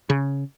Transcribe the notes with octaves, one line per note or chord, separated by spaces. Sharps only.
C#3